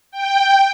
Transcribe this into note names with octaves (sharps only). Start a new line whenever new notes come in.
G5